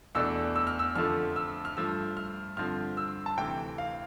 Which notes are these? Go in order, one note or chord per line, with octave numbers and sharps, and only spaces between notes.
E2 B2 A3 D4 E6
E6
F6
E6
F2 D3 F3 A3 F6
E6
F6
G2 F3 A3 E6
F6
G2 D3 F3 C4 F6
E6
A5
D2 C3 E3 A3 G5
F5